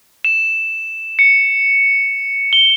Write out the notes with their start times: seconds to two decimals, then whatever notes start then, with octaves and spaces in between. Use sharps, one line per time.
0.25 E7
1.19 C#7
2.53 G7